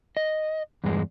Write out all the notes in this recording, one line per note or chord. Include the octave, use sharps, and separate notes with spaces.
D#5
E2 G2 G#3